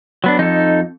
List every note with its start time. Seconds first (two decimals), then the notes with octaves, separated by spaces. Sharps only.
0.24 F#3 B3 D4
0.39 F2 D#4 A4